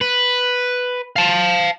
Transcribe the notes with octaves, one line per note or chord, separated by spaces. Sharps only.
B4
F5 A5